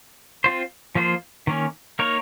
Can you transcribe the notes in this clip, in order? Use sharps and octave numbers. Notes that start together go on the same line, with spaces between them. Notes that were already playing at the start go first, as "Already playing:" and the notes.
C4 F4 C5
F3 A#3 F4 C5
D#3 A#3 C#4
A#3 D#4 A#4 C#5